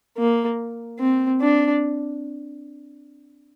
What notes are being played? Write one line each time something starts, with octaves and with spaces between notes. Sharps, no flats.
A#3
C4
D4